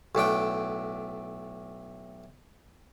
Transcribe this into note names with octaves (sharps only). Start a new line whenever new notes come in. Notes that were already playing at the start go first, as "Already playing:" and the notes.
B1 A2 D4 G5